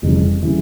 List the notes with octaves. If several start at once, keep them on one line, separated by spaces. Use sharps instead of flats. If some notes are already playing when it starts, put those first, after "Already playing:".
F1 F2 C#3 E3 G3
C#3 E3 G3